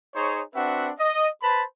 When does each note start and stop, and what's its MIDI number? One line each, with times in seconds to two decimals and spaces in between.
0.15 0.41 63
0.15 0.41 68
0.15 0.41 72
0.15 0.41 73
0.55 0.90 60
0.55 0.90 62
0.55 0.90 66
0.55 0.90 71
0.55 0.90 76
0.55 0.90 78
0.99 1.27 75
1.42 1.63 71
1.42 1.63 72
1.42 1.63 81
1.42 1.63 83